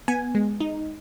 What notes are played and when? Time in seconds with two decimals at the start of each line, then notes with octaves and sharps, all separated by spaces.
0.08 B3 G#5
0.35 G#3
0.60 D#4